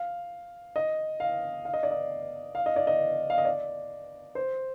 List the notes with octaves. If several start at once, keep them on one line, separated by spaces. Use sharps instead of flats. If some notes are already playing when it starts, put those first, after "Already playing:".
Already playing: F5
D#5
F5
F5
D#5
D5
D#5
F5
D#5
D5
D#5
F5
D#5
D5
C5